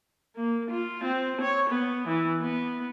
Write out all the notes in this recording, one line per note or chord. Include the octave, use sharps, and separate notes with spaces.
A#3
F4
C4
C#5
B3
E3
B3